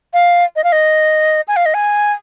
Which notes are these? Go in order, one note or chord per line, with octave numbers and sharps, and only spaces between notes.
F5
D#5
F5
D#5
G#5
F5
D#5
G#5